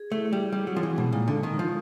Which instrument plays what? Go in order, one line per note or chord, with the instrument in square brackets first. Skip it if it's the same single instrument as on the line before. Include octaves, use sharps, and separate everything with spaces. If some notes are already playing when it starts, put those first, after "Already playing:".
Already playing: [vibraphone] G#4
[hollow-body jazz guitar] A3 [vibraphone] E4
[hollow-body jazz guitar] G3 [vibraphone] G#4
[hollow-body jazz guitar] G3 [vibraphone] C4
[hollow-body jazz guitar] F#3
[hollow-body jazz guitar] F3 [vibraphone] E4
[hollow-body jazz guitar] E3
[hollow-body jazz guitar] B2 [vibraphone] G#3
[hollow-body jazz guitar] A#2 [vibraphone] D#4
[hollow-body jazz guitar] D3
[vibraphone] D#4
[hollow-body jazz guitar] D#3
[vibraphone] D#4
[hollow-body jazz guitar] F3